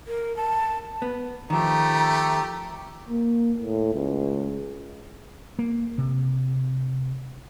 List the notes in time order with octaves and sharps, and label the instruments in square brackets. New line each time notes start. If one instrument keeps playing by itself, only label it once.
[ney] A#4
A5
[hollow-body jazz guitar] B3
[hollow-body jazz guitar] D#3 F3 [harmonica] A3 G4 [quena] A#5
[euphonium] A#3
A2
C#2
[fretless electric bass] A#3
C3